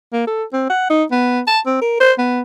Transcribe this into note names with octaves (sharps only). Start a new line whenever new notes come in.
A#3
A4
C4
F#5
D#4
B3
A5
C4
A#4
C5
B3